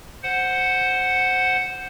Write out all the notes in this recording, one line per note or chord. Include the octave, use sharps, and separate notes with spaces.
C5 F#5